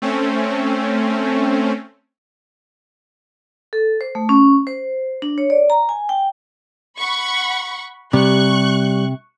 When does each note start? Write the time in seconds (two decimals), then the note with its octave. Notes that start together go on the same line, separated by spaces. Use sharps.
0.02 A3 C4 C#4
3.73 A4
4.01 C5
4.15 A3
4.29 C#4
4.67 C5
5.22 D4
5.38 C#5
5.50 D5
5.70 A#5
5.89 G#5
6.09 G5
6.98 F#5 B5 C#6
8.13 C3 G3 C#6 F#6